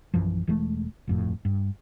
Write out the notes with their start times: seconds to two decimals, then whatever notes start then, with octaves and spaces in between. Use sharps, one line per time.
0.14 A#1 F#2 E3 F3
0.47 E1 E3 G#3 A3
1.08 G1 F2 A2
1.45 G2